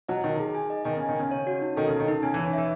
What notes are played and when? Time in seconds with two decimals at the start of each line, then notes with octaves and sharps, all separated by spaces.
0.09 F#3 D#5
0.24 D#3 D#4
0.39 G#4
0.55 G#5
0.70 D#5
0.85 D#3 D#5
0.97 C#3
1.00 G#5
1.09 D#3
1.16 C#3 G#5
1.31 C#5
1.47 F#4
1.62 D#4
1.77 D#3 A4
1.88 C#3
1.92 D#4
2.00 D#3
2.08 D#4
2.23 C#3 G#5
2.34 E3
2.38 C#5
2.53 E3 E5